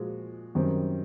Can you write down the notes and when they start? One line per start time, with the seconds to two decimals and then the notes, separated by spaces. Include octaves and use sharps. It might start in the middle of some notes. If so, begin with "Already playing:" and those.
Already playing: A#2 F3 G#3 F#4
0.55 F#2 D#3 G3 C4